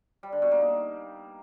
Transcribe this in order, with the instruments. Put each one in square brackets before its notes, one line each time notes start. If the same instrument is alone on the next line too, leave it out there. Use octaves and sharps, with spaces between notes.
[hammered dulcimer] G3
D3
B2
A#3
D#4